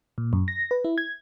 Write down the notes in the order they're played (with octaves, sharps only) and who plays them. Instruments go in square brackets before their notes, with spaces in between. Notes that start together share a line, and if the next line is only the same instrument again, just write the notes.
[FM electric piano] A#2
F#2
A#6
B4
E4
G#6